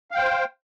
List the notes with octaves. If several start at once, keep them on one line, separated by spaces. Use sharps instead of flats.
C5 F5 G5